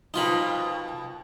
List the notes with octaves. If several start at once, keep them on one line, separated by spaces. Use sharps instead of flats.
F2 B2 D#4 F4 A#4 B5